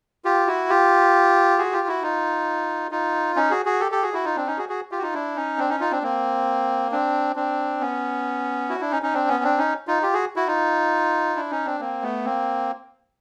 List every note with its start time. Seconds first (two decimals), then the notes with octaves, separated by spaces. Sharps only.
0.25 F4 G4
0.47 E4 F#4
0.69 F4 G4
1.58 F#4 G#4
1.73 F4 G4
1.88 E4 F#4
2.02 D#4 F4
2.91 D#4 F4
3.36 C#4 D#4
3.51 F#4 G#4
3.65 F#4 G#4
3.80 G4 A4
3.92 G4 A4
4.03 F#4 G#4
4.14 E4 F#4
4.25 D#4 F4
4.36 C4 D4
4.47 C#4 D#4
4.58 F#4 G#4
4.69 F#4 G#4
4.91 F4 G4
4.99 F#4
5.02 D#4 F4
5.14 D4 E4
5.36 C#4 D#4
5.58 C4 D4
5.69 C#4 D#4
5.80 D#4 F4
5.92 C4 D4
6.03 A#3 C4
6.92 C4 D4
7.36 C4 D4
7.81 B3 C#4
8.69 E4 F#4
8.80 D4 E4
8.91 C#4 D#4
9.02 C#4 D#4
9.14 C4 D4
9.28 B3 C#4
9.44 C4 D4
9.58 C#4 D#4
9.88 D#4 F4
10.03 F4 G4
10.14 F#4 G#4
10.36 E4 F#4
10.47 D#4 F4
11.36 D4 E4
11.51 C#4 D#4
11.65 C4 D4
11.80 A#3 C4
12.03 A3 B3
12.25 A#3 C4